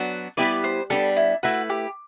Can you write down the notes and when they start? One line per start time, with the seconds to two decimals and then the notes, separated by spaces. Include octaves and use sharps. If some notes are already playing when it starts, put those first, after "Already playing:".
Already playing: F#3 B3 D4 F#4
0.37 G3 B3 E4 G4 B4 D5
0.64 C5
0.90 G3 B3 D4 A4
1.17 E4
1.43 A3 E4 F#4 B4
1.69 G4